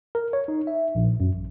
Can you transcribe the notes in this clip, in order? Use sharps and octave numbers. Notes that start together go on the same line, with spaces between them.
A#4
C#5
D#4
E5
A#1
F#2
A1